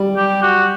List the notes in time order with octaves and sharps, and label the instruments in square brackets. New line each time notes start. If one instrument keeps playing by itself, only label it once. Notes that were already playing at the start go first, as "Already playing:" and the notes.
Already playing: [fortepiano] G3
[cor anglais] G4
F#4